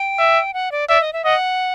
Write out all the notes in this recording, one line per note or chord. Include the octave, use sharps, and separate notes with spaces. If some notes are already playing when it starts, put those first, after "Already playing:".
Already playing: G5
E5
F#5
D5
D5 E5
D#5
E5
D#5 F#5